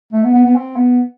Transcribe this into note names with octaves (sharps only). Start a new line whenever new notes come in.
A3
B3
B3
B3
C4
B3